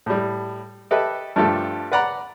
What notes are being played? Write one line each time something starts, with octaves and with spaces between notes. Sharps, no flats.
A2 G3
G4 A4 B4 D#5 E5
G2 F3 A3 G4 A4
B4 D5 F#5 A#5 B5